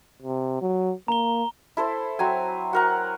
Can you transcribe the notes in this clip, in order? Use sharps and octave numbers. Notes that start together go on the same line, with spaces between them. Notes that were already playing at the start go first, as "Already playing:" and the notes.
C3
F#3
A#3 A#5 G7
E4 A4 C5
F#3 C4 G#5
F#4 A#4 F#5